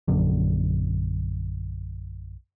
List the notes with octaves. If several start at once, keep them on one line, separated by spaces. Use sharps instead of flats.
A#1 F#2 D3